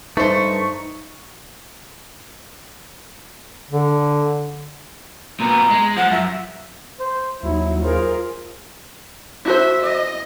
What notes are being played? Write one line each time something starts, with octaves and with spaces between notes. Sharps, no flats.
G2 A3 D#4 B4 C5 C#6
D3
A#2 B3 A#5
G#3
F3 F#5
F#2 E5
C5
D#2 F#3 D#4 E4
F4 G#4 A#4 C5
E4 F#4 C5 E5
D#5